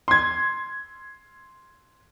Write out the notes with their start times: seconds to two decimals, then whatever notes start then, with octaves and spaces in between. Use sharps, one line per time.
0.08 C6 G#6